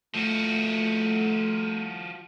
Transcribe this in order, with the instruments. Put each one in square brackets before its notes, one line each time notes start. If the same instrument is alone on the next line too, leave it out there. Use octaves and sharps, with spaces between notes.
[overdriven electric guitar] F3 F#4 [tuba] A3